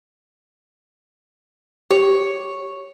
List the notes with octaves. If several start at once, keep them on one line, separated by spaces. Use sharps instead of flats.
G4 C#5